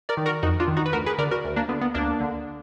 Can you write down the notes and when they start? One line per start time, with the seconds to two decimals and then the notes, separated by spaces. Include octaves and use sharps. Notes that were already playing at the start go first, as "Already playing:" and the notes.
0.09 A#4 D5
0.17 D#3
0.26 F#4 A#4
0.43 F2 D#4 F#4
0.60 D4 F4
0.68 D#3
0.77 D#4 F#4
0.86 B4
0.93 D2 F#4 A#4
1.06 G#4 B4
1.18 D3 A#4 D5
1.31 F#4 A#4
1.44 D2
1.56 A#3 D4
1.69 D3 B3
1.81 B3
1.94 D2 A#3 D4
2.20 D3